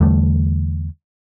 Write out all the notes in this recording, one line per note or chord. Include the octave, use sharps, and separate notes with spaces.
E2 D3 G3 A3